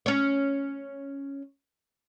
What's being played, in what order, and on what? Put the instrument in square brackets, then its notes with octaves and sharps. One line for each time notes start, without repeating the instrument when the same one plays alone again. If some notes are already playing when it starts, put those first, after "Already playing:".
[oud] C#4 C#5